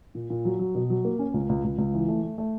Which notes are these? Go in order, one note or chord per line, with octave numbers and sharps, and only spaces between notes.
A#2
A#2
F#3
F#3
B2
F#3
A#3
C#4
C#2
C#2
C#2
C#2
E3
A3
A3
A3